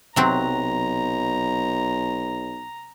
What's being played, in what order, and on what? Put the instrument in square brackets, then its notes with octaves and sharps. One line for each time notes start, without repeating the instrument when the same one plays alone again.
[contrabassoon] B1 [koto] C3 F#3 C4 [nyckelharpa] A#5